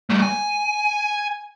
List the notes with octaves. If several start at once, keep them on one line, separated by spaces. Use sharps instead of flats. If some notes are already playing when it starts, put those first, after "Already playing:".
G3 A3
G#5